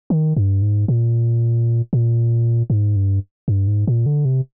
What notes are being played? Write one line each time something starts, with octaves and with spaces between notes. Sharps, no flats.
D#3
G2
G#2
A#2
A#2
G#2
G2
G2
G#2
A#2
D3
C3